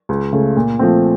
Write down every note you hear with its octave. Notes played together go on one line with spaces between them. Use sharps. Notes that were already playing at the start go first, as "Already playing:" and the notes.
C#2
C#3 A3
A#2
F3 A3 C4